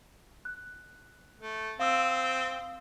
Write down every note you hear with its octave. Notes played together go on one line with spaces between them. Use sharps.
F#6
A3
C4 F5 D#6 E6